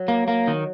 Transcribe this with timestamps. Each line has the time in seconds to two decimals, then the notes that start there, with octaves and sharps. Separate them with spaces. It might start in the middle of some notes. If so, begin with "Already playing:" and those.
Already playing: F#3
0.08 A#3
0.28 A#3
0.47 D#3